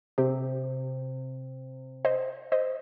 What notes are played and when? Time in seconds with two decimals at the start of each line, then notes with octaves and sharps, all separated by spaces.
0.18 C3 G4
2.05 C5 D#5
2.52 C5 D#5